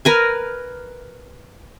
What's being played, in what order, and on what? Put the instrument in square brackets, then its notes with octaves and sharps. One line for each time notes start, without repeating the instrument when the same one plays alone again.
[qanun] A#4 B4 G#5